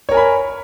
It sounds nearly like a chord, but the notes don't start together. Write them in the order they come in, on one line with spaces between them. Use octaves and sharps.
C#5 A#4 G#5 B5